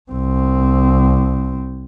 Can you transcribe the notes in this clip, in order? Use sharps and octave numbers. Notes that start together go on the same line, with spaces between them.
C2 C4